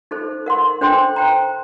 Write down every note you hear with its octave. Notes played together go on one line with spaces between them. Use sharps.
D#4 A4 C5
A#4 F#5 C6
D4 A4 C5 G5 C6
C5 G5 A#5